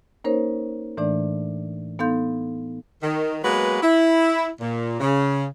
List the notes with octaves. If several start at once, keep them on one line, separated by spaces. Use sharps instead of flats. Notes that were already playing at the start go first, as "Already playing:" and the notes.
A#3 C#4 D#4 A#4 C5 C#5
A2 E3 A3 D4 D5
B3 D#4 A4 F5 C6 G6
D#3
F#3 G#3 A#3 B3 F#4 B4
E4
A#2
C#3